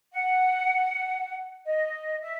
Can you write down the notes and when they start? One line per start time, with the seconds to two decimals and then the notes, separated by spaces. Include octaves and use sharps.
0.12 F#5
1.65 D#5
2.21 E5